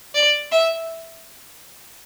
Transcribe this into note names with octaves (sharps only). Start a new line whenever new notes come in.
D5
E5